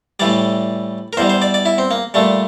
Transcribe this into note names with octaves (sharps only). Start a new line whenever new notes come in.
A2 E3 G3 D5
A#4
E2 E3 G3 C5
C5
D5
D5
E4
C4
A#3
A#2 G3 A3